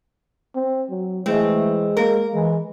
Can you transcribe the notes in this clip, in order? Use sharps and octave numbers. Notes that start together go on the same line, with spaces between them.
C4
F#3
E3 G#3 A3 C4
A#3 A#4
E3 G#3